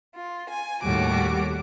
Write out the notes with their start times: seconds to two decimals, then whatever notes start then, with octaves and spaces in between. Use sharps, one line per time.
0.14 F4
0.48 G#5
0.83 D#2 A2 G3 F#4 D6